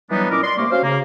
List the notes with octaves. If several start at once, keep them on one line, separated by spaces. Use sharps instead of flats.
E3 F#3 G3 B3 D4 D#4
A#2 C#4 E4 A#4 D#5 D6
D5 C6
C3 A3 A#3 A#4 C#6 D6
C#4 F#4 C5 F5
C#3 A#3